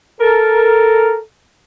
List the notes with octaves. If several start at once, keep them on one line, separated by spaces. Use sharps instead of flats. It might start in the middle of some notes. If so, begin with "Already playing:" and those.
A4 A#4